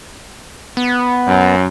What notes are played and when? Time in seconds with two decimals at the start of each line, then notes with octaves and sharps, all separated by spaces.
0.77 B3
1.27 F#2